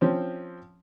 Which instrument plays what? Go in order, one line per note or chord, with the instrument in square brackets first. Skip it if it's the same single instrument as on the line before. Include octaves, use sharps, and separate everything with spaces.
[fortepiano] F3 C4 C#4